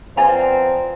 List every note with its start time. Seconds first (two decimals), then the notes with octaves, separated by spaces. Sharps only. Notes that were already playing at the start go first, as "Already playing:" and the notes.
0.17 F3 B3 C4 D5 G#5 A#5